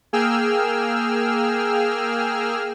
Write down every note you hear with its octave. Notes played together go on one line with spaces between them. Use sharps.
A#3 G#4 G5 E6 F6